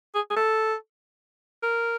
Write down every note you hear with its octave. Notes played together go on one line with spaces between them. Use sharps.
G#4
G#4
A4
A#4